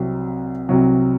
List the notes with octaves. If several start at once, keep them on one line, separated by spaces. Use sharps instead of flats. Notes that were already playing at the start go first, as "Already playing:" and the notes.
Already playing: C2 C3 F#3
C2 C3 F#3